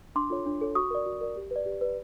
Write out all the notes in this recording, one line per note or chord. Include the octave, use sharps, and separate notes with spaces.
D4 C6 D6
F4 A4 C#5
D4
F4 A4 C#5
F#4 C#6 D#6
A#4 D5
F#4
A#4 D5
G4
B4 D5
G4
B4 D5